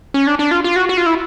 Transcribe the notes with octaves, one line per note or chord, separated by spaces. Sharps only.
C#4
D4
D4
F4
F4
F#4
F#4
F4
E4